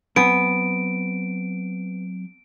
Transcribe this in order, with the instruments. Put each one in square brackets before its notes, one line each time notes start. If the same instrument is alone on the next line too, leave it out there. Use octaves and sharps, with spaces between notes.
[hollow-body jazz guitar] F#3 C4 G#5 [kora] B3 [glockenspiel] D7